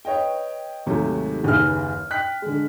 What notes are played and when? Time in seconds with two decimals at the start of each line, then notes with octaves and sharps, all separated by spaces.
0.05 B4 C#5 D#5 G5
0.86 D#2 G#2 C3 D#3 F#3 A3
1.44 F#1 D#2 G#4 B4 F6
2.10 G5 F#6 B6
2.42 D3 G#3